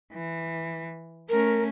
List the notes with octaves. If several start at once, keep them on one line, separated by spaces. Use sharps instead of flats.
E3
A3 C#4 A#4